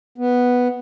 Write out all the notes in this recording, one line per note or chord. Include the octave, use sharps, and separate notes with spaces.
B3